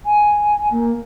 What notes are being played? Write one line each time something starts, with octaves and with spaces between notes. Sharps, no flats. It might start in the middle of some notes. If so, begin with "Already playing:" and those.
G#5
A#3